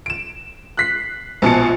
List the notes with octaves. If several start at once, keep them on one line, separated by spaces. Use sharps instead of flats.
D7 E7
F#6 B6 C7
A#1 B2 A5 C#7